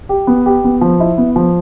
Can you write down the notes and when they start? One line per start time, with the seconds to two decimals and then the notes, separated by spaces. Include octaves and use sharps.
0.09 G4
0.27 B3
0.46 G4
0.64 B3
0.81 F3
1.00 E4
1.18 B3
1.36 F3